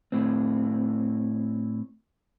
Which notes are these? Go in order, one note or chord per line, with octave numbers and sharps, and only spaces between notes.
A2 C4